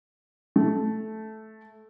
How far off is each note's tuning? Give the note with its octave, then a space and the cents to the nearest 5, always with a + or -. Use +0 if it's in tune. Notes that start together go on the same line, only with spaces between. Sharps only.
A3 -10